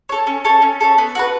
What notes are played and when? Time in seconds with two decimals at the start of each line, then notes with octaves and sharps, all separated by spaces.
0.09 A4 C#5
0.27 C#4
0.45 A4 C#5
0.62 C#4
0.81 A4 C#5
0.98 B3
1.15 F#4 B4